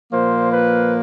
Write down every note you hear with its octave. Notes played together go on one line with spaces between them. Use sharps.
A#2 F3 A#3 C5
B4